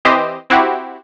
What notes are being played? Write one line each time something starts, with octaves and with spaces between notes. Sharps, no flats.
E3 C4 G4 C5 D#5
C4 E4 F#4 G4